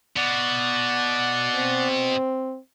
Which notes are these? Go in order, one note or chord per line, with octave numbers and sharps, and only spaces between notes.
B2 D5 F#5
C4